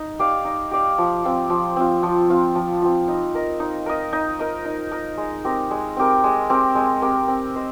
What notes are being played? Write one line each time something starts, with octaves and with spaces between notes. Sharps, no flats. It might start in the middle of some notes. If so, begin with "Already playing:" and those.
Already playing: D#4
G4 D5 F5
D#4
G4 D5 F5
F3
C4 F4
F3
C4 F4
F3
C4 F4
F3
C4 F4
D#4
A#4 D#5
D#4
A#4 D#5
D#4
A#4 D#5
D#4
A#4 D#5
G#3
C4 G4 A#4
G#3
C4 G4 A#4
G#3
C4 G4 A#4
G#3
C4 G4 A#4
C4
C5 D#5